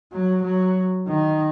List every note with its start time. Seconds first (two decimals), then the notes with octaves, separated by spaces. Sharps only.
0.12 F#3
0.43 F#3
1.08 D#3